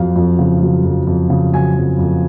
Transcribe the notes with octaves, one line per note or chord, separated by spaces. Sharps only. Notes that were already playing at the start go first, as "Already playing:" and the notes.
Already playing: F2 F#3 F5
F2
C#3
F#3
F2
F2
C#3
F#3 G#5
F2
F2